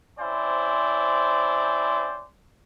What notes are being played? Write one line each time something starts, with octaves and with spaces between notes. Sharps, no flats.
C4 C#4 E4 C5 D5